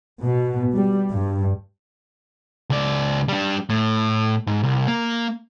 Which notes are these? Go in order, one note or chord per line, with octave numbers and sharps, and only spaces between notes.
B2
G3
G2
C#2 D5
G3 D4
A2
G#2
C2
A#3